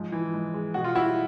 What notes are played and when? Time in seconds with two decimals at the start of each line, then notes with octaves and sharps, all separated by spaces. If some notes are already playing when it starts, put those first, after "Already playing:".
Already playing: G#2 F3
0.12 E3
0.34 G#2
0.54 G#3
0.74 B2 F#4
0.84 F4
0.95 G3 E4 F#4